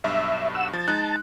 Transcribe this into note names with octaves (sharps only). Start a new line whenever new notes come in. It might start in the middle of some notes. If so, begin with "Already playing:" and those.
B1 G2 E5
F#5 E6
F3 A5
G#3 D#4 F#6